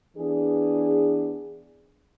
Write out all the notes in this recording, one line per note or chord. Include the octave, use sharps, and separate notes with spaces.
E3 B3 D4 G#4